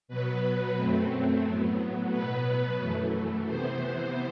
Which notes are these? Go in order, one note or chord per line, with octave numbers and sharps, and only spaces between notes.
B2 F#3 B3 B4
F#2 F#3 A3 C4
A2 F#3 B3
B2 F#3 B3 B4
F#2 E3 A3
C3 E3 B3 C5